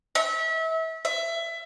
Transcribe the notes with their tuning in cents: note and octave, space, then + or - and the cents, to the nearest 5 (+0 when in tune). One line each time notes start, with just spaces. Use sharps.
E5 -30
E5 +20